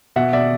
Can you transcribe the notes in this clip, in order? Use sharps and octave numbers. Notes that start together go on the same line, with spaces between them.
B2 E5 F#5
B2 D5 E5